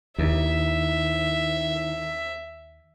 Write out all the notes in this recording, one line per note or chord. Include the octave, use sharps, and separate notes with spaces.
D#2 D#3 D#4 E4 E5